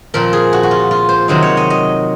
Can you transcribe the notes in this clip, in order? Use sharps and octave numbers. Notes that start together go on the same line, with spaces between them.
A#2 F3 C4 A#4
G#4
F#4
F#4
F4
F4
C5
C3 D#3 F#3 C4 D#4 C5
C#5
D#5
D#5